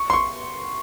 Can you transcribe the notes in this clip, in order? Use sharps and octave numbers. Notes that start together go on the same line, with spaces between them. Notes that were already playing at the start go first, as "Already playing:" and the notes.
Already playing: C#6
C6
C#6